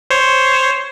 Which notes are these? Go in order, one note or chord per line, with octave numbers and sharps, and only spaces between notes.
C5 C#5